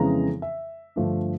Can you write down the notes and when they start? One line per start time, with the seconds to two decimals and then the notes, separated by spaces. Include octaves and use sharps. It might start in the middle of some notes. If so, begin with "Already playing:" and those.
Already playing: F2 C#3 E3 G#3 B3 A#5
0.42 E5
0.96 G2 D3 F3 A3 D4